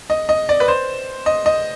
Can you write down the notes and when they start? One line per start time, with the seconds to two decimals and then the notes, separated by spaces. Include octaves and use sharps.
0.10 D#5
0.29 D#5
0.49 D5
0.60 B4
0.68 C5
1.26 D#5
1.46 D#5